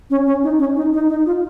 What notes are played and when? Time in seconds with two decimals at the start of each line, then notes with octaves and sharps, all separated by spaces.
0.10 C#4
0.27 C#4
0.43 D#4
0.59 C#4
0.76 D#4
0.93 D#4
1.09 D#4
1.26 F4